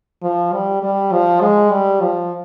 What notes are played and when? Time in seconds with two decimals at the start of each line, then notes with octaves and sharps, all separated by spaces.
0.22 F3
0.53 G3
0.82 G3
1.12 F3
1.41 G#3
1.70 G3
2.01 F3